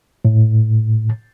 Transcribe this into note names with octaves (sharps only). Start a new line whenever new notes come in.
A2